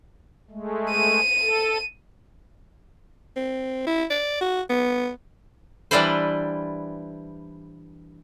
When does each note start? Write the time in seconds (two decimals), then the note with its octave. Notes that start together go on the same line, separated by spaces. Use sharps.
0.51 G#3 A3
0.90 D#7
1.40 A4
3.36 C4
3.87 E4
4.10 D5
4.41 F#4
4.69 B3
5.91 E3 G3 D4 E4 B4 C5